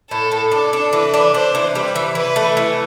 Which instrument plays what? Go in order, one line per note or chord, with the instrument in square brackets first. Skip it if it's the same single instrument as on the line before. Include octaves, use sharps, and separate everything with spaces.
[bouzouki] A2 [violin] A4
[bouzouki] A2
[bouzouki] D4 [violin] A4
[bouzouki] D4
[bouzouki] E3 [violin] B4
[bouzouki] D4
[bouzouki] D4 [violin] C5
[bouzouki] E3
[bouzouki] G3 [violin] B4
[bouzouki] E3
[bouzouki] E3 [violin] B4
[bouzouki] A3
E3